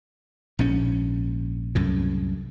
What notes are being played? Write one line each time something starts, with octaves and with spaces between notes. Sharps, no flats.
A#1 G#2 C#4
C2 F#2 A2